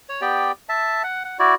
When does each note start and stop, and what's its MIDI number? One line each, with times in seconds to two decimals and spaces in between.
0.09 0.21 73
0.21 0.52 59
0.21 0.52 67
0.21 0.52 74
0.21 0.52 79
0.69 1.02 76
0.69 1.02 81
1.04 1.23 78
1.25 1.38 78
1.39 1.55 64
1.39 1.55 66
1.39 1.55 74